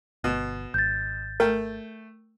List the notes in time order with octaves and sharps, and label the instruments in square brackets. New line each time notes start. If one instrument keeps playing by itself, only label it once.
[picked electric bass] G1 [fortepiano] B2
[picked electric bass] G#1 [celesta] G6 A6
[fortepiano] A3 G5 [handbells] A#4